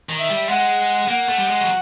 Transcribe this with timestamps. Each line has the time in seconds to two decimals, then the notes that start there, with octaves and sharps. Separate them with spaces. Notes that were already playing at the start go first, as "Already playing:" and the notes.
0.09 D#3
0.19 E5
0.30 G3
0.49 G#3 F#5
1.08 A#3 F#5
1.29 A3
1.39 G3
1.48 G#3
1.61 F#3